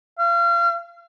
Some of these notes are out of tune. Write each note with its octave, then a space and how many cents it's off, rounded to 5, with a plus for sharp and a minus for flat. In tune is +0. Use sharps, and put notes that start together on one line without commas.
F5 -30